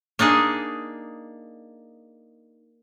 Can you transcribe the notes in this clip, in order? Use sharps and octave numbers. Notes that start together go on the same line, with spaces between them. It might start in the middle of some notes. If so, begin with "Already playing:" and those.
A#3 D4 D#4 G#4